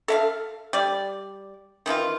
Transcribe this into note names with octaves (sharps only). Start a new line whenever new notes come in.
A4 E5 F5
G3 D5
D#3 E3 E4 F4